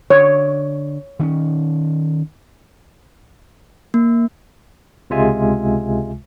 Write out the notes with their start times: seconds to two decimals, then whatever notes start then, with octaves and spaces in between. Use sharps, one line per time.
0.10 D3 C#5
1.19 D#3 C4 C#4
3.94 A#3
5.10 C#2 C3 G#3 F4 E5 G#5